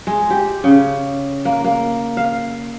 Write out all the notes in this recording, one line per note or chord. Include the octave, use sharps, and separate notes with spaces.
G#3
G4
C#3
A#3
A#3
F5